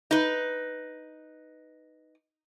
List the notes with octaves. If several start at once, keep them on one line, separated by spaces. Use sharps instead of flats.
D#4 B4